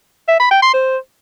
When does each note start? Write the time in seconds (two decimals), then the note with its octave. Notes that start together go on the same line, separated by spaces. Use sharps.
0.28 E5
0.39 B5
0.51 G5
0.62 C6
0.73 C5